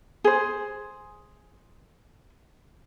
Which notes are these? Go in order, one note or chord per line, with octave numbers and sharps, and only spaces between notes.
G#4 C5